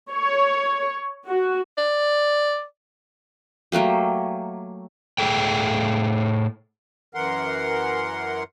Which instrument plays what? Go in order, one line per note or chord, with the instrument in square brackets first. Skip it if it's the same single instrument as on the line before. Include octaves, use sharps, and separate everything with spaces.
[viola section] C#5
F#4
[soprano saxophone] D5
[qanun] F#3 A3 A#3 G4
[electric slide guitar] A2 G#4 A4 G5
[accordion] F#2 E3 A#4 F#5 C6